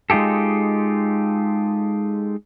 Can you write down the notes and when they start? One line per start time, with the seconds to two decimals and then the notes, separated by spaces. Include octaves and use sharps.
0.10 G#3 D#4 F4 G4 A4